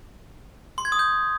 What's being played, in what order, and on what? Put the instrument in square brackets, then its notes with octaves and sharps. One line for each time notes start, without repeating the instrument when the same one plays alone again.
[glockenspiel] C6
G#6
D#6
G6